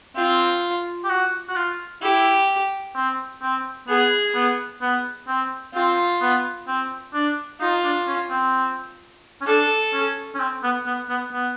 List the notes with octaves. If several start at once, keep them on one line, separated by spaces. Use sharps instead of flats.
C4 F4
G4
F#4
F#4
F4
E4 G4
C4
C4
B3 G#4
B3
B3
C4
C4 F4
B3
C4
D4
D#4 F4
D4
C#4
C4
C#4
D4 A4
C#4
C#4
C4
B3
B3
B3
B3